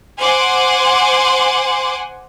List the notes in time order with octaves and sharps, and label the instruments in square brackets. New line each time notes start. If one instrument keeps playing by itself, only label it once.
[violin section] C5 F#5 G#5 C6 D6